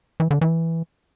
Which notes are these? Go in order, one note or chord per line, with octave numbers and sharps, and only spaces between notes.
E3
D3
E3